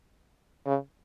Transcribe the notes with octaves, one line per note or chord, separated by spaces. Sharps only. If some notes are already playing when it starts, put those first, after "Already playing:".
C#3